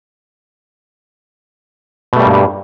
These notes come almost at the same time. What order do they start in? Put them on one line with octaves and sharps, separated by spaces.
B2 A3 G3 A#3 G2